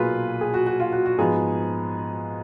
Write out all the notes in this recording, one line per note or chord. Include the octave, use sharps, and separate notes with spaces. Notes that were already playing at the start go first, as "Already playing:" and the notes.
Already playing: B1 A#2 F#3 A#3 F4 G#4 B4
G#4
F#4
F#4
F4
F#4
F#4
G#2 F3 B3 G#4